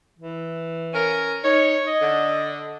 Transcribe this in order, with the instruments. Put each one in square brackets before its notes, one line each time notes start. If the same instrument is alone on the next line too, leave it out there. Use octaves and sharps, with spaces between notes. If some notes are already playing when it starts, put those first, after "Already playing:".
[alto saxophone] E3
[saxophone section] C#4 A#4
[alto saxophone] D#4 [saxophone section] C#5
[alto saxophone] D#5
[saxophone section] D3